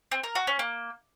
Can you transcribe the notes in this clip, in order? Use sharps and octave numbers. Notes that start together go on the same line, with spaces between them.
C4
A#4
F#4
C#4
A#3